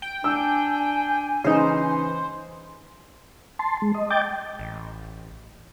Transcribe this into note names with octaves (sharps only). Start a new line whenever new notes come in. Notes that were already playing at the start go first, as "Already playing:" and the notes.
G5
D4 G#5 E6
C#3 E3 D#4 C5
A5 C6
G#3
D#5
D#5 G5 D6 G6 A6
A1